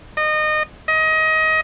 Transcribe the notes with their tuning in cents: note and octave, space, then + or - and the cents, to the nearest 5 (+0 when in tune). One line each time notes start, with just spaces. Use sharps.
D#5 -25
D#5 +25